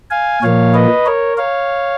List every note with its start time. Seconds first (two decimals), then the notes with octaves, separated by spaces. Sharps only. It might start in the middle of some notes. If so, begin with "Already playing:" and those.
0.11 F5 G#5
0.42 A#2 F3 A#3 C#5 F5
0.74 B4 D#5
1.06 A#4 C#5
1.37 C#5 F5